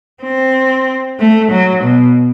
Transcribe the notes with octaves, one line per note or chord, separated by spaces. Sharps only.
C4
A3
F#3
B2